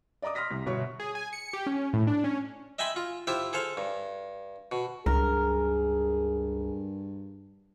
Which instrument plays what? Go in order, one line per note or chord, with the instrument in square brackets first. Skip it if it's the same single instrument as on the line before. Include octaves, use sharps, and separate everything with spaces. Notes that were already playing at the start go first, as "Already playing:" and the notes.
[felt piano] D5 D#5 A#5 D6 D#6
C6 D#6 F6 A#6 B6
C2 C3
G1 B2 C#5 E5 C#6
[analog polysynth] G#4
G#5
C#7
G4
C#4
A2
D4
C#4
[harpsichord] D#5 E5 G5 G#5 B5 C6
F4
E4 F4 G4 C5 E5
G#4 A4 C5 F5
G2
B2
[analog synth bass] C#2 [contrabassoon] G2 [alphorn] G#4 [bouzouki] A#4